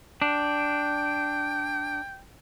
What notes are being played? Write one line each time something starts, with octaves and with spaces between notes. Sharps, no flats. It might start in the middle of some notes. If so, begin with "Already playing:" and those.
D4 G5